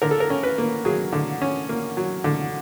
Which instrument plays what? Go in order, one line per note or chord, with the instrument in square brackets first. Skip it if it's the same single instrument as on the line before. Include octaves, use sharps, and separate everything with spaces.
[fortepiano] D3 A#4
A4
A#4
C#4
B4
A#3
F#3 G#4
D3
C#4
A#3
F#3
D3